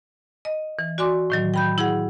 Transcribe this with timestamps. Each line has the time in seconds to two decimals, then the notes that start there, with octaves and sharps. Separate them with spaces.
0.45 D#5
0.79 E3
0.98 F#4 D5 G#5 C6 D6
1.30 A2 D#3 F#3
1.54 G5 B5 G6
1.78 E4 G#4 F#5